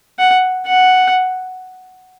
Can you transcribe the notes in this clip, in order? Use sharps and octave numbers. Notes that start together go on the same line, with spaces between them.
F#5
F#5